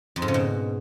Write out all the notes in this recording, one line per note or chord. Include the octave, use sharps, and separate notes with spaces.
F2
G#2
C#3
B2